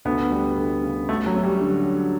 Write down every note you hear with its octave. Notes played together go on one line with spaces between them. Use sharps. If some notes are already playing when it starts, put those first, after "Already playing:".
D2 B3
G3
D2
C#3
A3 F#4
F#3
C#4
G3
D3
F#3